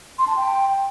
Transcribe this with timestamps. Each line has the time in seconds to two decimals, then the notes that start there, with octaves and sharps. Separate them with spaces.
0.19 C6
0.27 A5
0.36 G5